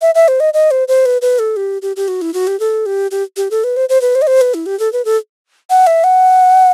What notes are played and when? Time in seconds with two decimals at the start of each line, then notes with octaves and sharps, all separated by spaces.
0.01 E5
0.15 E5
0.28 C5
0.40 D#5
0.54 D#5
0.71 C5
0.88 C5
1.05 B4
1.22 B4
1.39 A4
1.56 G4
1.82 G4
1.96 G4
2.08 F#4
2.21 E4
2.34 F#4
2.47 G4
2.60 A4
2.86 G4
3.11 G4
3.37 G4
3.51 A4
3.64 B4
3.76 C5
3.89 C5
4.01 B4
4.15 C5
4.22 D#5
4.27 C5
4.41 B4
4.54 E4
4.66 G4
4.79 A4
4.93 B4
5.05 A4
5.70 F#5
5.87 E5
6.04 F#5